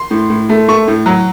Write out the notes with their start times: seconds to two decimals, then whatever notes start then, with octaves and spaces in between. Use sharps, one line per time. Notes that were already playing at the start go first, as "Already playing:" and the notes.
Already playing: C6
0.11 A2
0.30 A2
0.49 A3
0.68 A3 C#6
0.88 A2
1.06 F#3